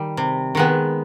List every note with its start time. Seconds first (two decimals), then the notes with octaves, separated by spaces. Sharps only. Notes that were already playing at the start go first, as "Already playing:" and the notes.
Already playing: D#3 G3
0.17 C3
0.55 D#3 G#3 B3